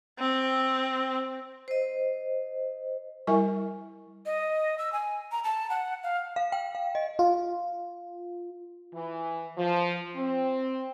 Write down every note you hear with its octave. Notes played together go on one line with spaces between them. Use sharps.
C4
C5 D#5
G3 E4 A#4 E5 G#5 C#6
D#5
E6
G#5
A#5
A5
F#5
F5
F5
G5
F5
D#5
F4
E3
F3
C4